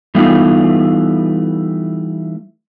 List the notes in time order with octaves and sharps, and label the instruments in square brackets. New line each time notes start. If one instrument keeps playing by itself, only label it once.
[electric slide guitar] E3 G3 A3 B3 D#4 F4